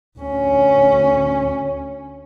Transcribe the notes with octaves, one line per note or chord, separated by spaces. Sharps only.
D2 C#4